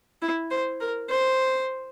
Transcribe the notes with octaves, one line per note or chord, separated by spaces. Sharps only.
E4
C5
A#4
C5